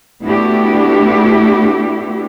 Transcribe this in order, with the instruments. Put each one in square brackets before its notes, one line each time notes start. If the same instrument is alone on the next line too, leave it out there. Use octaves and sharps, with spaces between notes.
[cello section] A3 B3 D4 E4 F#4 G4